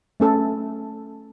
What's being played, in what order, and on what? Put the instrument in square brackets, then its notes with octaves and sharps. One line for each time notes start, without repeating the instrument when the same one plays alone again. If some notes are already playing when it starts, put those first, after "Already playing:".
[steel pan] A3 C#4 A4